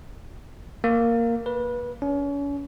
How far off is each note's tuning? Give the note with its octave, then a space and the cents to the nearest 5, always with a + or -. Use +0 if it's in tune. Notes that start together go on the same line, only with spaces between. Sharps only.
A#3 -5
B4 -25
C#4 +35